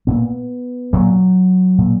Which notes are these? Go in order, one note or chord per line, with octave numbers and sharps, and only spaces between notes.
A#2 B3
A#2 F#3
A#2